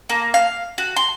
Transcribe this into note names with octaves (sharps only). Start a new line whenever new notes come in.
A#3
F5
F#4
C6